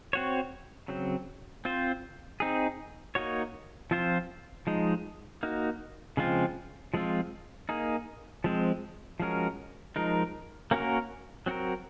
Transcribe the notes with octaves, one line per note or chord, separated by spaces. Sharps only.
C4 F#4 C#5
C#3 F#3 C4
C4 F4 C5
C4 D#4 G#4
A#3 D#4 F#4 C#5
F3 C4 F4 C5
F3 G#3 D#4
A#3 D#4 F#4
C#3 F3 G#3 C4 F4
F3 G#3 C4 F4
A#3 D#4 G#4
F3 G#3 C4
F3 G#3 C#4 F#4 A#4
F3 G#3 D#4 A#4
A#3 C#4 F#4 A#4
F#3 C4 F#4 A#4